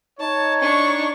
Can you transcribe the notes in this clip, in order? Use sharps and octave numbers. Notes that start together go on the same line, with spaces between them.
D#4 C#5 A5
D4 C#6